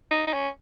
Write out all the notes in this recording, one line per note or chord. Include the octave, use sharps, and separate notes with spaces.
D#4
D#4
C#4